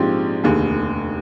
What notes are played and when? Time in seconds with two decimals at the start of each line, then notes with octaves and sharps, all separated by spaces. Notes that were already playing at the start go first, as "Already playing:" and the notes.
Already playing: A#1 G#2 F3 C4 G4
0.43 F1 D#2 D3 G#4